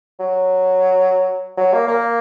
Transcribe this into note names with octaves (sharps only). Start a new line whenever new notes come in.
F#3
F#3
A#3
A#3